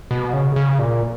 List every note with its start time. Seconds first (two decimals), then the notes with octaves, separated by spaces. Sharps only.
0.11 B2
0.33 C#3
0.56 C#3
0.79 A#2